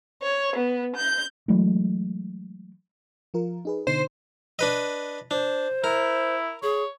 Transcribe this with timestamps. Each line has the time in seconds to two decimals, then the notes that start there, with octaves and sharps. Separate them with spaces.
0.21 C#5
0.55 B3
0.96 G6
1.48 E3 F#3 G#3 A3
3.34 F3 F4 A#4
3.65 D#4 G#4 B4
3.87 B2 D3 D#4 C5
4.59 D4 B4 D#5
5.31 D4 C5
5.84 E4 A#4
6.63 G#4 C#5